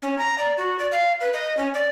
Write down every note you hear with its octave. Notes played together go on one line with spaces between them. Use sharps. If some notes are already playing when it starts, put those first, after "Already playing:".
C#4
A#5
D5
F#4
D5
F5
B4
D#5
C#4
D5